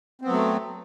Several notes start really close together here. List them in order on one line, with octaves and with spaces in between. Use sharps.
C4 B3 F#3 A3